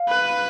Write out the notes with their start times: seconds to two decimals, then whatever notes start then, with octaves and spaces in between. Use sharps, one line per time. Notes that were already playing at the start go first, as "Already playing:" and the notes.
Already playing: F5
0.09 B4